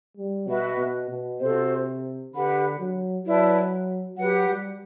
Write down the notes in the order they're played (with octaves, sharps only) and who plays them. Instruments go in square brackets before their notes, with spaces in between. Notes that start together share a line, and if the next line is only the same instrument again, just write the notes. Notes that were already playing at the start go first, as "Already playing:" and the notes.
[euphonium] G3
[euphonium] B2 [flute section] F#4 B4 E5 B5
[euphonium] B2
B2
[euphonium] C3 [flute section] F#4 A4 C5
[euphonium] D3 [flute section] G4 B4 F#5 B5
[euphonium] F#3
[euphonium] F#3 [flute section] E4 B4 D5 A5
[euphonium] F#3 [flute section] G4 B4 F#5
[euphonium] G3